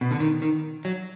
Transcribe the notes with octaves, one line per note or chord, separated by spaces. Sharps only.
B2
D3
D#3
D#3
F#3